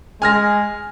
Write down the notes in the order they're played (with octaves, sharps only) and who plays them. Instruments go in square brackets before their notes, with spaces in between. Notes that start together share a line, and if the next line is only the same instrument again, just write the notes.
[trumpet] G#3 [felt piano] G#5 F6 A#6